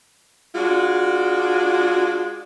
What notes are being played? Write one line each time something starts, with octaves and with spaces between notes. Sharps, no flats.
G#3 D4 F4 F#4